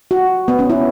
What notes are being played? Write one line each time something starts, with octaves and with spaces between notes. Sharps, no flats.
F#4
B3
C#4
E4